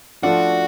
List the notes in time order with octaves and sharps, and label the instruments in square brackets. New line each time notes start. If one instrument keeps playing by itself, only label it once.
[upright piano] F3 A3 D4 F4 [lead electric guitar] F#4